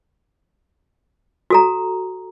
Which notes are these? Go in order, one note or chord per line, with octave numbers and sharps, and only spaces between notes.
F#4 A4 A#5